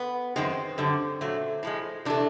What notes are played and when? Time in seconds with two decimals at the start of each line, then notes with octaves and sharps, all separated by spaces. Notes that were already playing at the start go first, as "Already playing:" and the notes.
Already playing: B3
0.36 F#2 D#3 G#3 C4
0.78 F#2 D3 G3
1.21 A#2 F#3 A3
1.63 A2 F3 G#3
2.05 C3 E3 A3 D4